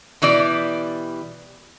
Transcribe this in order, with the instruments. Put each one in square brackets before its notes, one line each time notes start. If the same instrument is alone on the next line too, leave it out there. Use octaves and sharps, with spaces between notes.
[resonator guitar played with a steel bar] B2 E3 G3 D5